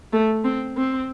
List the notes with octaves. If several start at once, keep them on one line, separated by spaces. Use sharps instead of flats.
A3
C4
C4